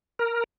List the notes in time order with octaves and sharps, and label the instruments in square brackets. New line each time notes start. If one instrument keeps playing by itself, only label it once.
[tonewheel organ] A#4